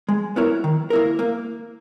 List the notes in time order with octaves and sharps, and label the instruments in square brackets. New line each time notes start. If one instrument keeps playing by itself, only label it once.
[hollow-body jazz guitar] G#3
B3 E4 A#4 C#5
D#3
A#3 E4 A#4
A#3